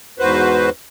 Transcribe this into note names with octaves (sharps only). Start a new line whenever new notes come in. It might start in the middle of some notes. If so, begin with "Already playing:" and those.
E2 G#2 F#4 B4 C5